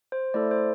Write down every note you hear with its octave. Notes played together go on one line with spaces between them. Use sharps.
C5
A3 E4 A4 D5
C5